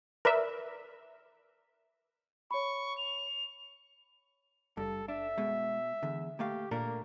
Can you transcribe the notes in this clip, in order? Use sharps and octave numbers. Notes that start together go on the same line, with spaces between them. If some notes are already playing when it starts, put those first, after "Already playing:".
A#4 B4 D5 E5
C#5 B5 C#6
F7
F#1 G2 A4
D4 E5
B2 G#3
E2 D3
A#2 A3 G4 F5
A#2 A3 A#3 D4 A#4